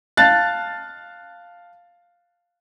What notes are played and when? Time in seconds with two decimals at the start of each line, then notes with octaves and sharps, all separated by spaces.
0.17 F5 A5 F#6 A6